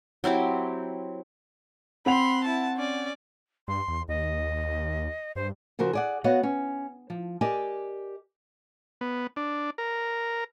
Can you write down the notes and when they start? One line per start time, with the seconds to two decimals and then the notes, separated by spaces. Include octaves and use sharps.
0.24 F#3 C4 E4 G4
2.06 C4 F#5 B5 C6 F7
2.44 E4 A5
2.76 C#4 D5
3.68 G2 C6
3.88 E2
4.08 D#2 D#5
5.36 G2 C5
5.79 C#3 F3 F#4 A#4 C5
5.93 G#4 D5 F#5
6.24 B3 F#4 C#5 D#5 F5 F#5
6.43 C#4
7.10 F3
7.41 G4 A#4 D5 D#5 G#5
9.01 B3
9.36 D4
9.78 A#4